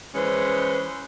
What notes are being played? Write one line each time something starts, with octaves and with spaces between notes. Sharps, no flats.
E3 G#3 C#4 B4 C5